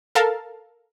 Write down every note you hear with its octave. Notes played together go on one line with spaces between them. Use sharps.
A4 A#4 F5 A5